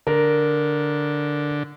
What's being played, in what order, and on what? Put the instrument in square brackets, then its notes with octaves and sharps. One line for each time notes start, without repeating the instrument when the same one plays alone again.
[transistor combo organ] D3 [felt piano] A#4